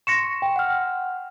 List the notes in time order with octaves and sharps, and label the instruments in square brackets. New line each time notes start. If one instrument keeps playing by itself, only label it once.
[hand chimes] C6 C#6 [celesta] A#6 C#7 E7
[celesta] G5
[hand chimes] F#5 F6